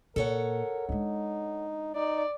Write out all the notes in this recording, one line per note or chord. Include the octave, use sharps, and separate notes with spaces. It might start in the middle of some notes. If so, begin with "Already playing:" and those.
A#2 A4 A#4 C#5 F#5
G#3 D4 D#4
D#4 D5